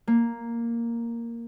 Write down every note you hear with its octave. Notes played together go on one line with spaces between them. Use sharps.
A#3